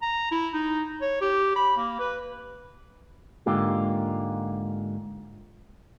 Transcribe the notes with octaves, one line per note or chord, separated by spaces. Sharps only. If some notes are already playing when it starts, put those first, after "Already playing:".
A#5
E4
D#4
C#5
G4
B5
A#3
B4
G#2 D3 A#3 F4 G4